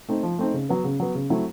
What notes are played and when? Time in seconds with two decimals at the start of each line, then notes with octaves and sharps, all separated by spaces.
0.09 A3 C4 D#4
0.23 F3
0.39 A3 C4 D#4
0.54 C#3
0.69 F#3 B3
0.84 C#3
1.00 F#3 B3
1.15 C#3
1.30 F#3 A3 C4 E4